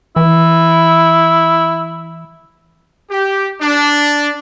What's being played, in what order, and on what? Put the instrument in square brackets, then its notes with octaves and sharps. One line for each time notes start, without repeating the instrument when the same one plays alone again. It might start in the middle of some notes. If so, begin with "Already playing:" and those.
[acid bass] E3 [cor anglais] E4
[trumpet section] G4
D4